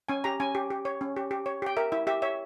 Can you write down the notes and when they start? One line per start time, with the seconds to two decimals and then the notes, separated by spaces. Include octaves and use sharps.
0.09 C#4 G#5
0.24 G4 A#5
0.40 C#4 G#5
0.55 G4
0.71 G4
0.85 C#5
1.01 C#4
1.16 G4
1.31 G4
1.46 C#5
1.62 G4 G5
1.77 A#4 E5
1.92 E4 E5
2.07 G4 E5
2.22 C#5 E5